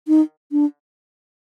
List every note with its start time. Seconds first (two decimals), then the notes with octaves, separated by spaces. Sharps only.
0.08 D#4
0.52 D4